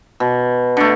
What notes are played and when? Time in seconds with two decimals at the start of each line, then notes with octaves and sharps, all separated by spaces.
0.20 B2
0.77 D3 A3